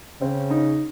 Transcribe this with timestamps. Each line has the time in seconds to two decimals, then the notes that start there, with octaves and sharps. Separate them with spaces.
0.21 C#3 C4
0.50 D#4